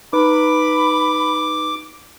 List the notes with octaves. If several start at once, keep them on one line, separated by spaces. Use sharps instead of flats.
D#4 B4 B5 D6